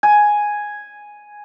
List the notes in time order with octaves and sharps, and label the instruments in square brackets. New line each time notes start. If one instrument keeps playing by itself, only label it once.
[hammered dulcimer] G#5